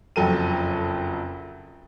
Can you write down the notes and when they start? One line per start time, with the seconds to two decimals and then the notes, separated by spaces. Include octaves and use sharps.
0.16 F#1 F2 F3 F#3 A4 D#7